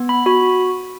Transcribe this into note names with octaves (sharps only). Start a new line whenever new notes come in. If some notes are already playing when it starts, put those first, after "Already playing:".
Already playing: B3
B5
F#4 B5